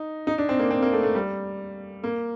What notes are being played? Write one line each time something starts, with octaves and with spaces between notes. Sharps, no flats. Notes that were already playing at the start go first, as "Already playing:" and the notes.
Already playing: D#4
D#4
D4
C4
A#3
C4
A#3
A3
A3
G3
A#3